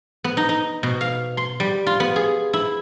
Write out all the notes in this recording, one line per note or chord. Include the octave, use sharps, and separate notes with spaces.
B3
D#4
D#4
B2
F5
C6
G3
F4
B3
G#4
E4